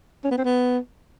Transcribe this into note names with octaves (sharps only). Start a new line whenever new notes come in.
C#4
B3
C4
B3